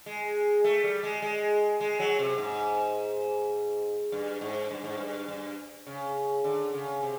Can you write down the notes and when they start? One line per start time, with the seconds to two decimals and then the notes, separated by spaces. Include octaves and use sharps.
0.06 G#3
0.64 A3
0.84 G3
1.03 G#3
1.22 G#3
1.80 G#3
2.00 F#3
2.19 C3
2.38 G#2
4.12 G2
4.41 G#2
4.71 G2
4.84 G#2
4.97 G2
5.28 G2
5.87 C#3
6.44 D3
6.73 C#3
7.02 C3